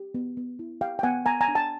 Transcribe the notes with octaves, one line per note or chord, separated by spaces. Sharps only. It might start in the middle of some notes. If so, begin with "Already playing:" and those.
Already playing: G4
B3
B3
E4
G4 F5 G5
G5
B3 F#5 G#5
B3 G#5 A#5
G#5 A#5
D4
G5 A5